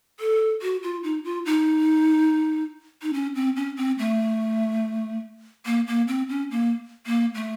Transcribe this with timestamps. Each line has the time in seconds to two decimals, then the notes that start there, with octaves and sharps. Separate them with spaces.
0.20 A4
0.62 F#4
0.83 F4
1.04 D#4
1.24 F4
1.46 D#4
3.02 D#4
3.13 C#4
3.35 C4
3.56 C#4
3.77 C4
3.99 A3
5.66 A#3
5.87 A#3
6.08 C4
6.29 C#4
6.51 A#3
7.06 A#3
7.34 A3